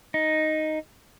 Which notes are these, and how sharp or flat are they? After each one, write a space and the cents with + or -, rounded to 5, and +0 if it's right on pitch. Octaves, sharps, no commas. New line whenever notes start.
D#4 +0